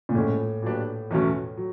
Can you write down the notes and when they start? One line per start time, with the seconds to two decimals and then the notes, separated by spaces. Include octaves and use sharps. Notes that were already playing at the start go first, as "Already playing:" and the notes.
0.09 A#2
0.15 A2 F3 G#3 C#4
0.62 A#2 F#3 B3 D4 G4
1.11 E2 B2 F#3 A3 C#4
1.57 F#3